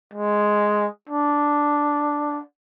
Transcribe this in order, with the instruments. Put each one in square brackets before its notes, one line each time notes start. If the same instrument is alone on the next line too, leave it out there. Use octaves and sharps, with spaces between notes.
[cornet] G#3
D4